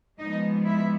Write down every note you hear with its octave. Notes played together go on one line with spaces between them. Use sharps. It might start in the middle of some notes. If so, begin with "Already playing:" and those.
G#2 F3 G#3 B3 D#4 D#5
E4 E5